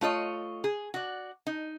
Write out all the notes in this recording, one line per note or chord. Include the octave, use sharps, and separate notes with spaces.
A3 F4 C#5 D#5
G#4
F#4 D5
D#4